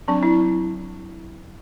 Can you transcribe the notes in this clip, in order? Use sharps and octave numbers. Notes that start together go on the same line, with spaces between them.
F#3 C4 D4
E4